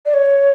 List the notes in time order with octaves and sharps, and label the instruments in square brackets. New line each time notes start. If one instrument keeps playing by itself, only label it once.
[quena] D5
C#5